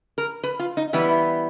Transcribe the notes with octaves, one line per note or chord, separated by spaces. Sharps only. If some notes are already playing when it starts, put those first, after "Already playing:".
A#4
B4
F4
D#4
E3 G3 B3 E4